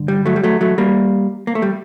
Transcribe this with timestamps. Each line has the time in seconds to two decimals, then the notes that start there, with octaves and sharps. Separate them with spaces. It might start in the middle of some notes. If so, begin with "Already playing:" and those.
Already playing: G2 D3
0.08 G3
0.26 F#3 A3
0.36 G3
0.43 F#3 A3
0.61 F#3 A3
0.78 G3 A#3
1.47 A#3
1.55 A3
1.62 G3